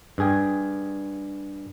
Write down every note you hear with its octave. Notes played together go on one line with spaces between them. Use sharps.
G2 G#4 G5